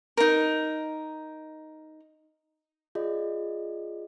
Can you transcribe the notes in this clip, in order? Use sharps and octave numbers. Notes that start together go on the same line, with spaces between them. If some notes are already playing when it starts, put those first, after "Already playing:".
D#4 A#4
F4 G#4 D5 D#5